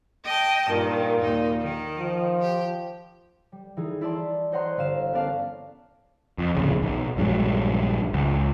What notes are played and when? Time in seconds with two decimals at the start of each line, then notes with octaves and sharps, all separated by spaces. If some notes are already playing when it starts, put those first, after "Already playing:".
0.24 D#5 G5 A5
0.69 G2 A#2 D#3
1.21 D#2 D#4
1.61 D#3
1.98 F3
2.41 G4
3.52 G3
3.77 E3 D#4 G#4
4.01 E4 D5 A5 C6
4.52 C5 C#5 D#5 F#5 A#5 C6
4.77 G1 F5 E7
5.13 B3 C#4 A#4 D5 F5 A5
6.38 F2
6.55 D1 A#1 C#3
6.82 B1
7.17 A#1 G2 F#3 G#3
8.13 C#2